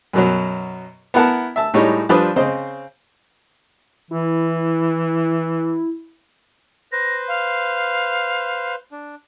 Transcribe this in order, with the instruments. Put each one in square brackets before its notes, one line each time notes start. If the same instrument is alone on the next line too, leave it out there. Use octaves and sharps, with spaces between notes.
[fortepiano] F#2 B2 F#3
B3 E4 A#4 F#5 A5
E5 A5 E6
A2 G3 G#3 D#4 C#5
F3 G3 D4 B4 C5 D#6
C#3 C4 C5 D#5
[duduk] E3 [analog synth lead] E4
[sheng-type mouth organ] B4 C5 [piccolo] A#6
[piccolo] F5
[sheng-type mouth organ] D4